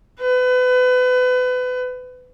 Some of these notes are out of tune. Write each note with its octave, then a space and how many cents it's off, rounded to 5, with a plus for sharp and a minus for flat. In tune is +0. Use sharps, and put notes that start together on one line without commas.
B4 +30